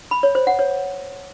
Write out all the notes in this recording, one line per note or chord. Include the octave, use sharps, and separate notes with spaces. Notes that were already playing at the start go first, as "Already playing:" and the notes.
B5
C#5
C5
F#5
C#5